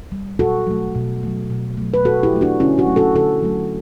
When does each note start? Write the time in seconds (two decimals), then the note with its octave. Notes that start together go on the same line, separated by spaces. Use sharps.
0.12 G3
0.39 B2 F#4 A4
0.67 F#3 A3
0.95 B2
1.23 F#3 A3
1.50 B2
1.77 F#3 A3
1.94 B4
2.05 B2 F#4 A4
2.23 E4 G4
2.33 F#3 A3
2.41 D4 F#4
2.60 D3 C#4 E4
2.78 D4 F#4
2.87 F#3 A3
2.96 F#4 A4
3.15 D3 F#4 A4
3.43 F#3 A3